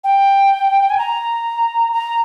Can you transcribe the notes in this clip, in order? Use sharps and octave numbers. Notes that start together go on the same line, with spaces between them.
G5
G#5
A#5
A#5